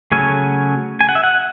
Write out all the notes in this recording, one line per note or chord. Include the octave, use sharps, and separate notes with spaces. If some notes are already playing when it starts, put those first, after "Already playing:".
C#3 F#3 A3 C#4 G#5
G#5
F#5
E5
F#5